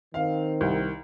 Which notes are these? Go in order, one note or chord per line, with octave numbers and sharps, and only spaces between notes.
D#3 C4 F5
C2